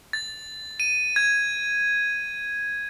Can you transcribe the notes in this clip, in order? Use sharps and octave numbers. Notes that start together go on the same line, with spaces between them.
A6
D#7
G#6